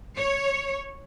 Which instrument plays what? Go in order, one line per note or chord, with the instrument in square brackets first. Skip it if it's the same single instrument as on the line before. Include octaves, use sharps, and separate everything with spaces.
[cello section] C#5